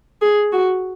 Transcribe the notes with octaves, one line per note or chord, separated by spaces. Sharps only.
G#4
F#4